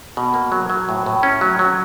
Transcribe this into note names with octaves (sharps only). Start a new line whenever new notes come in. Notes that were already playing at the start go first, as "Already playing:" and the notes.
B2
A#3
F#3
F#3
A2
A2
C#4
F#3
F#3